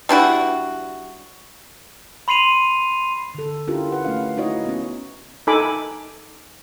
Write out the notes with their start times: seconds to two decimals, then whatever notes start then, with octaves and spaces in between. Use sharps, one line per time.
0.09 G3 D4 E4 F#4
2.28 B5 C6 C7 D#7 F7
3.35 D3 A4
3.67 C#4 D4 E4 F4 G4 A#4
3.92 B4 F#5
4.04 A3 C#4 F5
4.37 D#4 E4 F#4 C#5 D#5
4.65 B3 C#4
5.47 D#4 A4 G#5 B5 D6